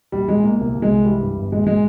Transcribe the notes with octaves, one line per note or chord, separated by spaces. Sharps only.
A#1 G3
A#1 G#3
A#2 A#3
C2 A#3
C2
G#3
C2
E3 G3
G2
G1
A#1 G#3
G#3